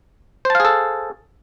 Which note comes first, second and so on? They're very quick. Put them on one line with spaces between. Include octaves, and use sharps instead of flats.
C5 A5 F5 G#4 A4